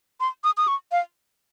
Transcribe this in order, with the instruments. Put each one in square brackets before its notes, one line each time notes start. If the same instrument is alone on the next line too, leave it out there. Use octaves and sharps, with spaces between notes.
[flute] C6
D#6
D#6
C#6
F5